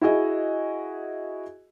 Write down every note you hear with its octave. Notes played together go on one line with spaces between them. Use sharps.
E4 F#4 G#4 D#5